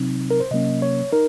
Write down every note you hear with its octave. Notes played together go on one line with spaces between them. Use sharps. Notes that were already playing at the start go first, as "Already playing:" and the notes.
Already playing: C3 F#3 C4 D#4
A#4
C5
C3 F#3 A#3 C#4 D#5
C#5
D#4 A#4